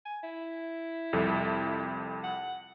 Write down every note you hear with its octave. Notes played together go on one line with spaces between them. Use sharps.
G#5
E4
C2 F2 A4
F#5